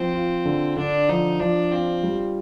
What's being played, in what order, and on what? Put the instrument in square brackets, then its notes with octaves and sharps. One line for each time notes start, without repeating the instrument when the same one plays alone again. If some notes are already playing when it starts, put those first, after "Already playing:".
Already playing: [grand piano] F3 [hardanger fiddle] C4
[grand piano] F4
D3
[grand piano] D3 [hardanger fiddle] D4
[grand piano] F3 [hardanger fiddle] D#4
[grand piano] F3 [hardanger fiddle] D4
[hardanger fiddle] C4 [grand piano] F4
[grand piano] G3